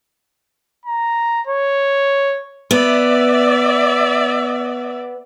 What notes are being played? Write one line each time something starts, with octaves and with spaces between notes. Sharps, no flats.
A#5
C#5
B3 D5 E5